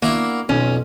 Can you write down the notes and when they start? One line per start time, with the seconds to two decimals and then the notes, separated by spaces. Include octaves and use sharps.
0.02 A#3 D4 E4 F#4
0.49 B1 F2 C#4